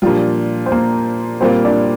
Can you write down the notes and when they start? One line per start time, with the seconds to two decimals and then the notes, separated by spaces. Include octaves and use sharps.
0.02 A#2 F3 G3 D4 F4 G4
0.66 C5
0.72 A#3 A#4
1.41 A#2 G3 A#3 C4 F4 C5
1.65 D4 D5